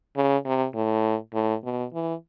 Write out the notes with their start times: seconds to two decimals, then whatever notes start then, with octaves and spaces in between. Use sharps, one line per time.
0.16 C#3
0.46 C3
0.75 A2
1.34 A2
1.64 B2
1.93 E3